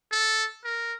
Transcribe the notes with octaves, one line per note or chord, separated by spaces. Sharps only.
A4
A#4